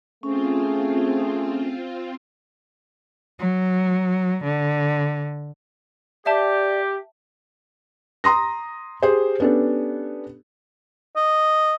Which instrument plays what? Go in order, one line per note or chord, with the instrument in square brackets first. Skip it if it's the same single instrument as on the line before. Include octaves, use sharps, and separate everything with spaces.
[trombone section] A3 G#4 [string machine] C4 F4 [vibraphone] C#4
[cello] F#3
D3
[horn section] G4 [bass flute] D5 [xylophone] E5 A5
[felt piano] A#5 C6 D#6 A#6
G4 G#4 C5
B3 C#4 D4 G4 A4
[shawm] D#5